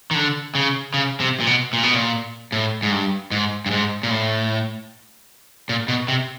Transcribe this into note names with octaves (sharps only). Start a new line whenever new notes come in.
D#3
D3
C#3
C#3
C3
A#2
B2
A#2
B2
A#2
A2
G#2
G2
G#2
G2
G#2
A#2
A2
A#2
B2
C3